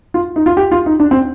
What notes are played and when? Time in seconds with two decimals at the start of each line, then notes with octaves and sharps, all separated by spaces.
0.14 F4
0.36 D#4
0.46 F4
0.57 G4
0.72 F4
0.86 D#4
1.00 D4
1.11 C4